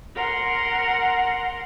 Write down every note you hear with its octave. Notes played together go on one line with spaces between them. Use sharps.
A#4 F#5 C6